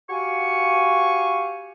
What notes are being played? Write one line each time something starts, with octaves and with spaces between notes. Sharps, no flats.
F#4 G4 F5 G#5 C#6